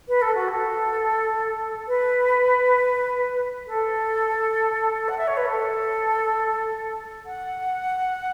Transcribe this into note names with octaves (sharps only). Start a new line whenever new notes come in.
B4
A4
F#4
A4
B4
A4
F#5
E5
C#5
B4
A4
F#5